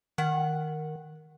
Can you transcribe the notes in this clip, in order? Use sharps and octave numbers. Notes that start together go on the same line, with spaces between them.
D#3 F#5